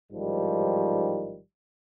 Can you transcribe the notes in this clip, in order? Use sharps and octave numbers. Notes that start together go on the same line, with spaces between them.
A1 G#2 D#3 F3 G3